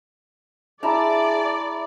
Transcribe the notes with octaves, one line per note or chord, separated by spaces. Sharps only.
E4 G#4 D5 A5 A#5